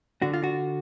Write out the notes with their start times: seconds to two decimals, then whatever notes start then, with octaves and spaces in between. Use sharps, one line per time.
0.22 D3 F#4
0.33 F4
0.44 F#4